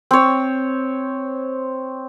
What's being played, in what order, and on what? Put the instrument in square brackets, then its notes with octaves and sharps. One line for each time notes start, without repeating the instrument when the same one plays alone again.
[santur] C4 C#5